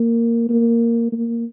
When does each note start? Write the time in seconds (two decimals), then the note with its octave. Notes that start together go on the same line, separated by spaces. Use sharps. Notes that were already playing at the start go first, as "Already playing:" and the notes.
Already playing: A#3
0.49 A#3
1.12 A#3